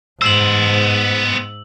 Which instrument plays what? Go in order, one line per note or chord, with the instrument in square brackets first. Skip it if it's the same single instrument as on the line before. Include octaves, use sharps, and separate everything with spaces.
[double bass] G#2 [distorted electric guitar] B3 C5 [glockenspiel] E6 F#7